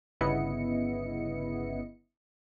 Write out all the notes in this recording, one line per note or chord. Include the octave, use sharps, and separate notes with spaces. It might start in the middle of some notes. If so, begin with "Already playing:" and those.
G1 C#3 B3 E4 D#5 C#7